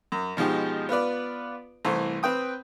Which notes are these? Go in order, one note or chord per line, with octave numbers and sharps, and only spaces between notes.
F#2
B2 F3 G#3 D#4 G4
B3 F4 B4 D5
C2 E3 A3 C5
C4 B4 G5 D#6